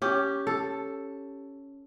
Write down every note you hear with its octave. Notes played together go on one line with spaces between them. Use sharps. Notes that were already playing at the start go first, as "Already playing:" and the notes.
C#4 G4
A4